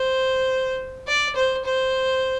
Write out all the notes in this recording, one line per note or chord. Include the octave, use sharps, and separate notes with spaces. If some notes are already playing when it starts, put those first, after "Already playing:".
Already playing: C5
D5
C5
C5